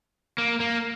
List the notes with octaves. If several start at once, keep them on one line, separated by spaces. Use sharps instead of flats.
A#3
A#3